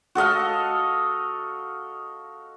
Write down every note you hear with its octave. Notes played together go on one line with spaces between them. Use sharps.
F#4 A4 D#5 F5